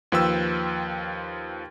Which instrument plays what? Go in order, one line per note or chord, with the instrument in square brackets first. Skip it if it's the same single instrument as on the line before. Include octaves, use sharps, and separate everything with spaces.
[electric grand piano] D#2 F3 B4 G5 E6